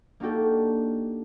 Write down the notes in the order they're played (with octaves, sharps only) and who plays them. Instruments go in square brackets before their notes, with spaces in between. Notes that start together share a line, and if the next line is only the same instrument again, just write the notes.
[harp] A#3 D4 D#4 F#4 G4 A4